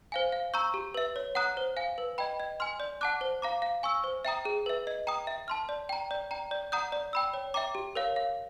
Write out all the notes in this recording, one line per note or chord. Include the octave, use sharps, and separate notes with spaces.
C5 F5 G#5
F5
A#5 C#6 E6 G6
G4
B4 E5
C#5
F#5 A#5 D#6 F#6
C5
F5 G#5
B4
D#5 G5 B5
D#5
G#5 C6 F6
D5
F#5 A5 D6 F#6
C5
F5 A#5 D6
F5
G#5 C#6 E6
C5
E5 G5 A#5 D#6
G#4
B4 E5
D#5
G5 A#5 D#6
E5
A5 C6 F6
D5
G5 A#5
D5
G5 A#5
D5
F#5 A#5 D#6 G6
D5
G5 B5 E6
C#5
E5 G5 A#5 D6
G4
A#4 C#5 F5
F5